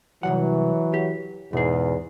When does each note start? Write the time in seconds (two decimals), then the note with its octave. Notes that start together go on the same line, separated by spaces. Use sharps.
0.23 C2 A#2 E3 F#3 F#5
0.94 G4
1.53 E2 G#2 B2 G#4